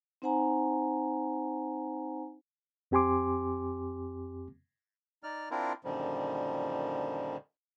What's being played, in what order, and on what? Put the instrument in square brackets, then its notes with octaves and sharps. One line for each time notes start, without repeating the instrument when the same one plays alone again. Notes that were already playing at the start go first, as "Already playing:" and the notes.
[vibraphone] C4 D#4 C5 F#5 G#5 A#5
[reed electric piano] F2 C4 G4 G#5 C6 D6
[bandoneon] D#4 D5 F6
C4 D4 E4 F4 A#4
F#2 A#2 D3 D#3 F3 G3